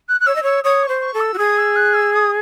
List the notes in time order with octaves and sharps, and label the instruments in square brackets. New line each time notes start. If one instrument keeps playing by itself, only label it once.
[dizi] F#6
F#6
[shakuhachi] C#5 [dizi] E6
[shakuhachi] D#5
[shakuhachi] C#5 [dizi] E6
[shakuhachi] C#5 [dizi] D#6
[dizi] C#6
[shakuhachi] C5
[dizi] C#6
[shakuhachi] A4
[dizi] E6
[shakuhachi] F#4
[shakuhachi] G#4 [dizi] D#6
[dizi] E6
F#6
E6
D#6